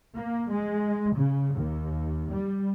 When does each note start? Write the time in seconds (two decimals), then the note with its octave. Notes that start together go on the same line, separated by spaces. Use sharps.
0.16 A#3
0.51 G#3
1.14 C#3
1.55 D#2
2.31 G3